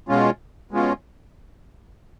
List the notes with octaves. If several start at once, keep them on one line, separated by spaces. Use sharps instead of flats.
B2 G#3 C#4 F4
B2 G#3 C#4 F4